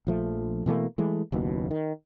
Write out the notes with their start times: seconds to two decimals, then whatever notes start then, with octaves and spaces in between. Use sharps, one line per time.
0.07 A#1 F3 A3
0.66 B2 E3 A3 A#3
0.98 E3 G#3 A3
1.32 F#1 D#2 B2
1.71 D#3